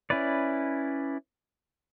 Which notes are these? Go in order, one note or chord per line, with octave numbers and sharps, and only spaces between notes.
C#4 E4 B4 D5